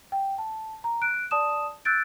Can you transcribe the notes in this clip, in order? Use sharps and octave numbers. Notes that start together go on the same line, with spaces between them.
G5
A5
A#5
F#6 D7
D5 A5 D#6 E7
E6 F#6 G6 A6 D7